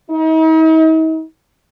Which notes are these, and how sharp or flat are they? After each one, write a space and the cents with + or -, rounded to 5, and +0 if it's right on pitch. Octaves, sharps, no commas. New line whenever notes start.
D#4 +45